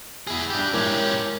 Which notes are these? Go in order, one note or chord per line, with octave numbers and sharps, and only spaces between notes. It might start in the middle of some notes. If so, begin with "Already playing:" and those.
E4 G#4
D4 G4
G#3 C#4 E4 G4 A#4